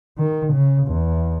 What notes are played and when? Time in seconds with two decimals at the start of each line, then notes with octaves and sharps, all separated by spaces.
0.18 D#3
0.53 C#3
0.88 E2